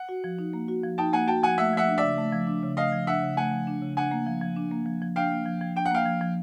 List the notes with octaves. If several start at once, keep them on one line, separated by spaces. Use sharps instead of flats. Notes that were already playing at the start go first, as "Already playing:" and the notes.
Already playing: F#5
F#4
F3
D#4
A#3
F#4
F3
D#4 G5 A5
A#3 F#5 G#5
F#4 G5 A5
F3 F#5 G#5
A3 E5 F#5
F3 E5 F#5
D4
D5 E5
C#3
A3
F3
D4
C#3
A3 D#5 F5
F3
D4 E5 F#5
C#3
A3 F#5 G#5
F3
D4
C#3
D4 F#5 G#5
A#3
F3
F3
D4
A#3
F3
F3
D4 F5 G5
A#3
F3
F3
D4 G5
F#5
A#3 F5 G5
F3
F3